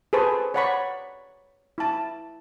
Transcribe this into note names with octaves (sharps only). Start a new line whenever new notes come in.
G#4 A4 B4 C5 A5 C#6
C#5 D5 F#5 A#5 B5 C#6
E4 A5